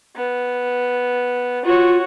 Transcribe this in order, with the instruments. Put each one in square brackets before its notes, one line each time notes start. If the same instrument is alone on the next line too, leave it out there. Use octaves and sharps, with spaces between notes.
[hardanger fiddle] B3
[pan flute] F4 [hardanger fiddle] F#4 C#5